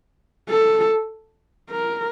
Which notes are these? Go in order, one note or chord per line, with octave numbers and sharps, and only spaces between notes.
A4
A#4